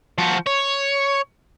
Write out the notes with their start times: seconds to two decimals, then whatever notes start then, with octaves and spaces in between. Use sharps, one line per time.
0.18 F3 F#4
0.46 C#5